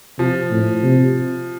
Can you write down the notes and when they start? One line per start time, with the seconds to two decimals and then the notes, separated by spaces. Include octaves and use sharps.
0.19 C3 F3
0.51 A2
0.84 C3